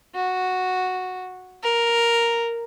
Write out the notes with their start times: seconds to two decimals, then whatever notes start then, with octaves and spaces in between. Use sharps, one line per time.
0.15 F#4
1.63 A#4